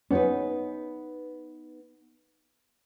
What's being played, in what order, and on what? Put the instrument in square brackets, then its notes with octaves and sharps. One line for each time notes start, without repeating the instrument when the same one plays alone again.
[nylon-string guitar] B3 D#4 B4 [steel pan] C#4